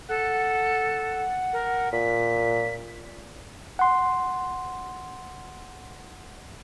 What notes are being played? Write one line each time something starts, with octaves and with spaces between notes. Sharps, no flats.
A4 F#5
A#4
A#2 B6
F#5 C6